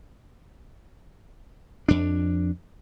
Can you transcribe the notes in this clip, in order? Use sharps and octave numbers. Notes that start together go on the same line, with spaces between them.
F2 D4